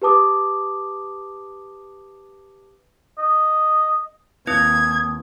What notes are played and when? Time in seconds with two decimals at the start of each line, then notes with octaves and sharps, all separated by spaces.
0.02 G4 B4 A5 D6 D#6
3.18 D#5
4.47 D#2 C4 E4 B4 D#6 G#6